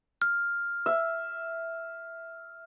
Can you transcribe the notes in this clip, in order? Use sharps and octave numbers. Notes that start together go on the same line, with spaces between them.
F6
E5